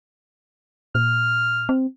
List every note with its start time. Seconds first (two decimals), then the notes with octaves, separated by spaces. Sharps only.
0.95 A#2 F6
1.69 C4